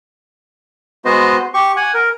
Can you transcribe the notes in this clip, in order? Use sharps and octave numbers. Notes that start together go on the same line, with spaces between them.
G#3 B3 F#4 C5 D#5
G4 C#6
F#5 G#5
A#4